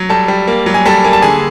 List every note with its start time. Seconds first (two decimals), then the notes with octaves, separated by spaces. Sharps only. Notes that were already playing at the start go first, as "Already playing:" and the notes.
Already playing: F#3
0.09 G3 A4 A5
0.28 G3
0.47 A#3
0.66 F#3
0.74 G#5
0.86 G3 A4 A5
1.04 A#3 G#5
1.13 A5
1.22 D3 G#4 G#5